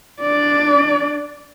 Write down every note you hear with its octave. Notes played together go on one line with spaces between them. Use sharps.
D4 D5